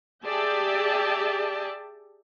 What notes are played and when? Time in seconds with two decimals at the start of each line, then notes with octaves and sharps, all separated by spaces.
0.25 G4 G#4 D5 E5 G5 A5